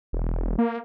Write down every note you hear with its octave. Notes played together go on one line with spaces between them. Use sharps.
E1
A#3